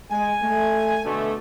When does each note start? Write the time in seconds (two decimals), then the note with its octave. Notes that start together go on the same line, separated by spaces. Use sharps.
0.11 G#3 G#5
0.43 A3
1.05 B2 D3 A3